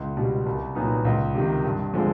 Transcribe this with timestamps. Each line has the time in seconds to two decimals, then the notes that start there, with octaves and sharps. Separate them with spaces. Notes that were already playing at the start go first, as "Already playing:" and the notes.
Already playing: C#2
0.17 B2 G3
0.46 C2
0.75 A#2 F#3 B3 D#4
1.05 C#2
1.35 C3 D#3
1.64 G2
1.94 D3 F3 G#3 C4